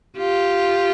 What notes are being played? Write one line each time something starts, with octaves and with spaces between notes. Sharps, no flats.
F4 G4